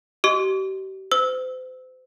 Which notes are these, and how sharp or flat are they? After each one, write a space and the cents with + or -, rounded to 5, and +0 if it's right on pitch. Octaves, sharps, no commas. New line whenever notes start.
G4 -40 D#5 +0 D6 -45
C5 -35 E6 -20